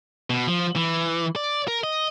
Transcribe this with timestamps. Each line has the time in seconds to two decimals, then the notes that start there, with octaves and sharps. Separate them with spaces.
0.30 B2
0.48 F3
0.76 E3
1.36 D5
1.68 A#4
1.84 D#5